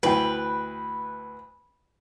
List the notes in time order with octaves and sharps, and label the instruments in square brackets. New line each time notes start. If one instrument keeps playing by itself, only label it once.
[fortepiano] D2 E3 G5 [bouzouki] B4